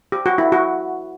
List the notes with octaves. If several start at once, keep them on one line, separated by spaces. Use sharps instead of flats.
G4
F#4
E4
F#4